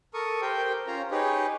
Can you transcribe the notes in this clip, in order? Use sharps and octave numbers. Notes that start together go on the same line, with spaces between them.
A4 A#4 C#6 D#6
G4 A#4 C5 G5
C#4 F4 C5 C#5 A#5
D#4 G4 G#4 B4 C#5